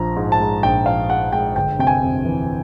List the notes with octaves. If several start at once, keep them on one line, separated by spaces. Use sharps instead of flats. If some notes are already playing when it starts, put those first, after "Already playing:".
Already playing: A#1 F3 A#5
G#2
A5
G#3
A#1 G5
F3 F5
G#2 F#5
G#3 G5
G1 G5
C3 G5
G#5
F2
E3